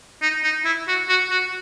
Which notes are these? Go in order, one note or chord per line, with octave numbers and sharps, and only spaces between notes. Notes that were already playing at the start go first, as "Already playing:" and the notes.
D#4
D#4
E4
F#4
F#4
F#4